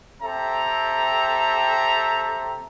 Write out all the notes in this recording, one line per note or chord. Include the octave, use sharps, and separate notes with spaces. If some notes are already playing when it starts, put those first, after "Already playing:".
C4 G4 A4 E5 A#5